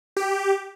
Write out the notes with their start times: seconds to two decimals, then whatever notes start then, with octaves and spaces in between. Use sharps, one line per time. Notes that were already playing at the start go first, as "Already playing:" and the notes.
0.17 G4